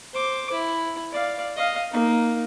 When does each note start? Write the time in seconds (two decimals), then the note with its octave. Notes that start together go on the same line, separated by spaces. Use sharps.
0.14 C5 D6
0.52 E4
1.12 D5 F5
1.56 D#5 F5
1.92 A#3 D#4